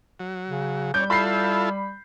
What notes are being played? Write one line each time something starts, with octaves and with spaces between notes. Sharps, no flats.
F#3
C#3
G3 C#4 D5 G6
E4 F4 A4 B5 C7